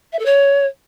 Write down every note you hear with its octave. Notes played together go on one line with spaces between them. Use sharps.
E5
A4
C#5